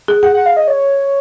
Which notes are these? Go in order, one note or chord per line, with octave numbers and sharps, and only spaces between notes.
G#4
G#4 F#5
F#5
F5
D#5
C#5